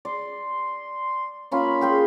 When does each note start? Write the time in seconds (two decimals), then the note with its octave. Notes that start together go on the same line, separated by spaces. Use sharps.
0.05 D5 C6
1.51 A#3 C#4 F4 B5
1.81 G#4 G5 C6